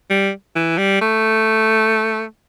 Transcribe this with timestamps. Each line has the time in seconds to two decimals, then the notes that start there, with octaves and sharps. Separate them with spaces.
0.10 G3
0.55 E3
0.78 G3
1.01 A3